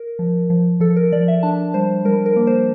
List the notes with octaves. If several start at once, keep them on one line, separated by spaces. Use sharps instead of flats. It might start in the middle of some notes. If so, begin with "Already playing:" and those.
Already playing: A#4
F3
F3
F3 A4
A#4
F3 D5
E5
D4 A5
G3 C5
G3 A#4
A#4
A#3
C5